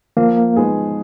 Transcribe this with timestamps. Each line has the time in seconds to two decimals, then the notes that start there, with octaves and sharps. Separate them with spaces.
0.17 F3 A#3
0.56 G#3 B3 D#4 G#4